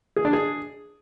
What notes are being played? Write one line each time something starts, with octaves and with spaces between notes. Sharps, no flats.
G#4
D4
G#4